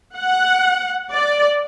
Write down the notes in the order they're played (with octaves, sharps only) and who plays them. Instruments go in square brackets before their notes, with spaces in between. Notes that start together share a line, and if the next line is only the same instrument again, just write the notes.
[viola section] F#5
D5